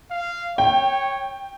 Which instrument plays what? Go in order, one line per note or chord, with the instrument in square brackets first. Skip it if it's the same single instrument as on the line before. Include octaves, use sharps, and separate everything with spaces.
[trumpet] F5
[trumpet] C#5 [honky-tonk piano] G5